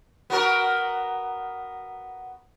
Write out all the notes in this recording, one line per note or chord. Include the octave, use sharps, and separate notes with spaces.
B3 F#4 A#4